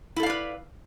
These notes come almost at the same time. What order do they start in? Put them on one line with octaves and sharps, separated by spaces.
E4 A4 F5 D5 B4